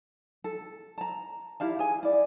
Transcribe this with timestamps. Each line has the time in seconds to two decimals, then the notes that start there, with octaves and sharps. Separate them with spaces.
0.44 A4
0.98 A5 A#5
1.60 E4 G4 F5 A5
1.79 G#4 G#5
2.03 E4 D5